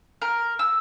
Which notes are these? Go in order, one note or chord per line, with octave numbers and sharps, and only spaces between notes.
A#4
E6